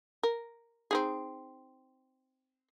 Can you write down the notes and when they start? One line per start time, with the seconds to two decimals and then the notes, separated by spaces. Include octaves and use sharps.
0.23 A#4
0.91 C4 D#4 G#4